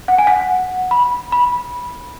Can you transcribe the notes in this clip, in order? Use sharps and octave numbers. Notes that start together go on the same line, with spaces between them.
F#5
G#5
F#5
B5
B5